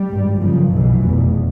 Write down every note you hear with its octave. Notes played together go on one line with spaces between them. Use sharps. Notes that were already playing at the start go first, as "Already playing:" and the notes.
Already playing: G3
G#1 G2
F#1 F#2 C#3 F3
B1 B2 E3
F1 E2 B2